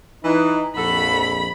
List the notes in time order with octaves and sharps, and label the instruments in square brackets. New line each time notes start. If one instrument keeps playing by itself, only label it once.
[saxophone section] E3 [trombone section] D#4
[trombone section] A#1 F2 [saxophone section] F#4 A4 [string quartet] B5